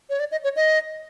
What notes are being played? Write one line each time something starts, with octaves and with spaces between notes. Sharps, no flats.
C#5
D5
D#5
C#5
D#5